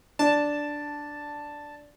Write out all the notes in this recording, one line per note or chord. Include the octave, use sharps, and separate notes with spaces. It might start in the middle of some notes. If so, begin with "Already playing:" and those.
D4 A5